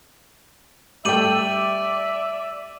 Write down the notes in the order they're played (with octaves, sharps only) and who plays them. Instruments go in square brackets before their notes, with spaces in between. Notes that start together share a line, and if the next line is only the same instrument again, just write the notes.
[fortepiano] G3 A3 G5 [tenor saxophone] D5 [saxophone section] E5 [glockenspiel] D6 D#7 F#7